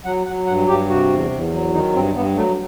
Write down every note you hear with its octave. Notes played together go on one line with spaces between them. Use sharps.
F#3 F#5
F#3 F#5
G2 F#5
G2 G4
C3 F#4
E2
E2
F#3
D#3 D#4
G2 C4
G2 B3
F#3 A3